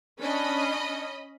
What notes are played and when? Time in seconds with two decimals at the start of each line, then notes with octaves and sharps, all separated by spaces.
0.22 C#4 D4 D#5 B5